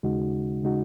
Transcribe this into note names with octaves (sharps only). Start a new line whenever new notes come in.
D#2 C#3 G#3 D#4 F#4
C#3 G#3 D#4 F#4